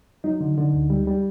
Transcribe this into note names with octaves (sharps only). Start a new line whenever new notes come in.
F#3 D#4
D3
D3
D2
G3
G3